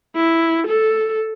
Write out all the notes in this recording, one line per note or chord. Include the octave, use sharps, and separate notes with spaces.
E4
A4